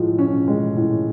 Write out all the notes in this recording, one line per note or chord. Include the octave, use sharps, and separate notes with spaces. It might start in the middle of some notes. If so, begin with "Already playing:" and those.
Already playing: A2 F3 G#3
C#4
G#3
A2